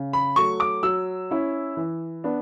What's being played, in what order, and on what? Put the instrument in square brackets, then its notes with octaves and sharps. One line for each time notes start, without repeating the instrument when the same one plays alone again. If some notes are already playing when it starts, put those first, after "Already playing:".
Already playing: [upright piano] C#3
B5
F#3 A3 C#6
D6
F#3 E6
C#4 E4
E3
B3 D4